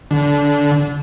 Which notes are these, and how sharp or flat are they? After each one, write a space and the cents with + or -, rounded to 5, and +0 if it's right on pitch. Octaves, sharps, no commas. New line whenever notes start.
D3 -20